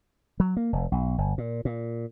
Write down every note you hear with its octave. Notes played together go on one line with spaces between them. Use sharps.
F#3
A#3
F1
B1
G1
A#2
A#2